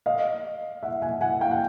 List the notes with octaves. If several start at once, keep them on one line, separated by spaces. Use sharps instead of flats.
D#5 F5
E5 F#5
F#5 G#5
F#5 G#5
F5 G5
F#5